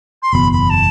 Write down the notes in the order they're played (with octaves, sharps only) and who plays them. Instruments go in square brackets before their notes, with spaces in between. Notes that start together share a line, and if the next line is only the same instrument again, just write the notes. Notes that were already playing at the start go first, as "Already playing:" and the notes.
[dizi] C6
[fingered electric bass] F#1 E2 B2 [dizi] B5
[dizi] B5
A5